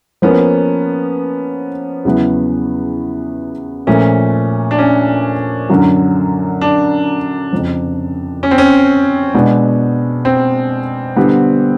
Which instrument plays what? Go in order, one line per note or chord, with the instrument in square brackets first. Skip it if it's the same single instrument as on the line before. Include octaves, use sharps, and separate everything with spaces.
[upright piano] F3 A#3 C#4 [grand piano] B3
[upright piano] E2 C#3 F#3 B3 E4
[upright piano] A#2 F3 A3 [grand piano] C#4
[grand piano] D4
C#4
[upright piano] F#2 D3 F#3
[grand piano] D4
[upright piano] F2 C#3 F3
[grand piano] C#4
C4
C#4
[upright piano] B2 G#3 B3 D4
[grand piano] C4
[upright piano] D3 G3 B3